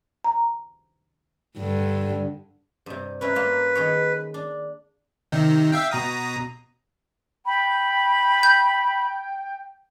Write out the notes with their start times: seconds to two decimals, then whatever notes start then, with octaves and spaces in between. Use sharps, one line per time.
0.24 A#5
1.58 G2 D3
2.86 G2 C3
3.21 C#4 E4 A#4 B4
3.35 A#3 F4
3.75 D#3 G#4 C#5
4.34 D4
5.32 C3 D#3 D#4
5.72 E5 F5 G5
5.91 B2 A#5 D#6
7.46 G5 B5
8.43 G6